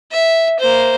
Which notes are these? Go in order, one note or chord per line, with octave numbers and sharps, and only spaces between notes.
E5
A#3 C5